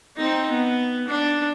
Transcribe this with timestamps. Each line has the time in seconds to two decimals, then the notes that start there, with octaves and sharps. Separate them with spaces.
0.17 C4 D#4
0.50 B3
1.08 D4